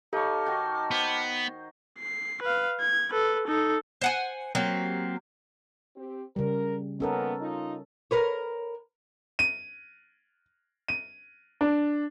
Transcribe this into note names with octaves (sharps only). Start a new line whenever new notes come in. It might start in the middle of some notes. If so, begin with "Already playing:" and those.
D#4 G4 A4 C#5 F5 A5 D6 F6
D#3 F#4 G6
B3 C5
C7
B4 F5
G#6
A4 B4
D#4 A4
C5 F#5 G#5
F#3 A#3 C4 G4
C4 G4
C#3 G3 A#4
D#3 A#3 B3 C#4 A4 A#4
D#4 F4
A#4 B4 C#5
D#7
D#7
D4